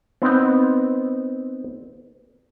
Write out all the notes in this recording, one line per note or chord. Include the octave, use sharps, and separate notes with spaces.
B3 C4 D#4